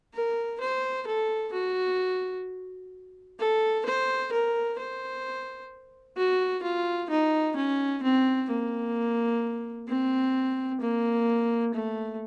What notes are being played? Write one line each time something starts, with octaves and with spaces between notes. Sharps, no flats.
A#4
C5
A4
F#4
A4
C5
A#4
C5
F#4
F4
D#4
C#4
C4
A#3
C4
A#3
A3